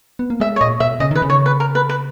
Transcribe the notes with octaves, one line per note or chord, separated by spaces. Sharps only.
B3
A#3
G#3 E5
C#5
A#2 D#5
B2 E5
C#3 D#5
D#3 B4
C#3
C#5
B4
A#4
B4
B4